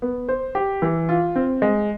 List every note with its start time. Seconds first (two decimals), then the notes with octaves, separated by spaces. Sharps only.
0.02 B3
0.29 C5
0.55 G4
0.82 E3
1.09 F4
1.36 C4
1.62 G#3